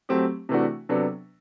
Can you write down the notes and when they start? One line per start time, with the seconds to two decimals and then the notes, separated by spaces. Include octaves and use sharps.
0.09 F#3 A3 C4 G4
0.49 C3 E3 A3 D4 F#4
0.89 C3 F#3 B3 D4 A4